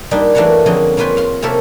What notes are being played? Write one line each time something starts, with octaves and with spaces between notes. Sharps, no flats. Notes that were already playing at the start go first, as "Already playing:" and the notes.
G3 A#3 D4 D#4
E3 A3 A#3 D4 F#4 C#5
F2 D3 A#3 C#4 G#4 D#5
A#3 C#4 F4 B4 G5 G#5
F5 C6
C3 A#3 C#4 A4 A#4 E5